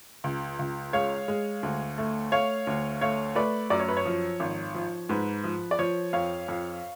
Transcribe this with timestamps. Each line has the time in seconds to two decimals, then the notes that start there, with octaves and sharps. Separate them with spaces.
0.24 C#2
0.59 C#2
0.93 G#3 C#5 F5
1.28 G#3
1.63 D2
1.98 A3
2.32 A3 C#5 F5
2.67 D2
3.01 A3 C#5 F5
3.36 A3 B4 D5
3.70 F#2 D5
3.80 C#5
3.88 B4
3.97 C#5
4.06 F3
4.40 G#1
4.75 F3
5.09 G#2 B4
5.44 F3
5.71 D5
5.79 F3 C#5
6.13 F2 C#5 F5
6.48 F2